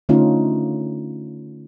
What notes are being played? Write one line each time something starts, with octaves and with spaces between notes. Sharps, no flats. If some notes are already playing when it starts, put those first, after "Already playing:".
D3 A3 C#4 D#4 F4